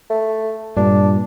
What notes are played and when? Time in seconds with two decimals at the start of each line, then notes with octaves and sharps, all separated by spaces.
0.10 A3
0.76 G2 A#2 D4